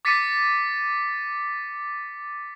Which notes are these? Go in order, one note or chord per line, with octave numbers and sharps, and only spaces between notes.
D6 A6 B6 C#7 D#7